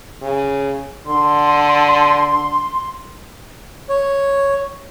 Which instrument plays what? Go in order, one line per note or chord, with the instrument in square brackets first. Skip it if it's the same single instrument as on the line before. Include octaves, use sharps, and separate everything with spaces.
[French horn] C#3
[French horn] D3 [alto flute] C6
[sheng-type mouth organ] C#5